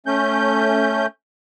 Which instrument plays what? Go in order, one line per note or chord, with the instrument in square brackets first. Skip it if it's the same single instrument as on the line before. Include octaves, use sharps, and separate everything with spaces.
[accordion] A3 C#4 G6